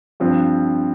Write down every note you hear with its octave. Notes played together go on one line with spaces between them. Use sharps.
G2 F3 C4